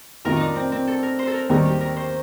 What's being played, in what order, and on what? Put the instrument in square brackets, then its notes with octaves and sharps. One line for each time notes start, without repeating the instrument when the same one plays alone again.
[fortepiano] F2 C3 D#3 A#3 F4 [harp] A#4
[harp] D4 D#4
C4
C4
A4
A#4
C5
A4
A#4
[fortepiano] D#2 D#3 G3 A#3 [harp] A#4
[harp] G4
A#4
C5